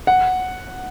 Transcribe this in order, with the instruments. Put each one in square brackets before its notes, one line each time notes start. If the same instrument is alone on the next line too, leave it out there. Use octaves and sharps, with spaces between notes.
[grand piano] F#5